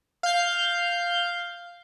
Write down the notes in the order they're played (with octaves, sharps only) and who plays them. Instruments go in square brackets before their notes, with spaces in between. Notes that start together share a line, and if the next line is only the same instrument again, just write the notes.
[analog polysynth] F5 G6